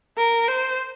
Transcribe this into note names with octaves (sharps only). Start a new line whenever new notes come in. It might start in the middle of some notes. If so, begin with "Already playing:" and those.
A#4
C5